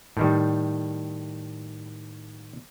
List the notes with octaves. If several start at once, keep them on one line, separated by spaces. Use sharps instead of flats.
A2 D#3 G3